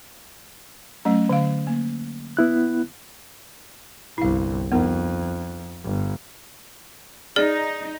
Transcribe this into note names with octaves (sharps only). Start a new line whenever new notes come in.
F#3 A3 C#4
D3 F5
A#3
B3 E4 F#6
G1 C2 E4 F5
F2 B3 D#4 A#4
G1
D#4 G#4 D5